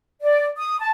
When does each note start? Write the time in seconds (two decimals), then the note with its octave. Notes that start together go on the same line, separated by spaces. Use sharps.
0.22 D5
0.57 D#6
0.79 A5